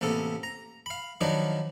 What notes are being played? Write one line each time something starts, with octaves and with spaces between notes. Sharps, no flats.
A1 C3 A#3 B3 A4
A#5
F5 B5
D#3 F3 F#3 D4 D#4 B4